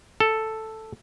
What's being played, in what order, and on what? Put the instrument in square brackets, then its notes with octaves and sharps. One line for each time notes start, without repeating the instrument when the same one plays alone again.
[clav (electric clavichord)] A4